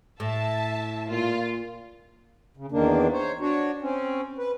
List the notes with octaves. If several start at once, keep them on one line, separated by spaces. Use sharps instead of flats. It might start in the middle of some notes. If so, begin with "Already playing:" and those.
A2 E5 A5
A#2 F4
C#3
E2 D#3 A#3 D4
C5 C#5
D4 F#4 C#5
C4 C#4
B4